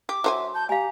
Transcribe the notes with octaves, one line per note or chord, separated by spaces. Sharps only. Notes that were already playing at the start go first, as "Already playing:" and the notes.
G4 D6
F#3 C5 E5 G#5
A5 G6
G4 F5 G#5 A#5